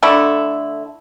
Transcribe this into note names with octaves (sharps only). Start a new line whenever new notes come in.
D3 A3 E4